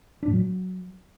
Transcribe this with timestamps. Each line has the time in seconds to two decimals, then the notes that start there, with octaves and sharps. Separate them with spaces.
0.23 D4
0.28 A2
0.33 F#3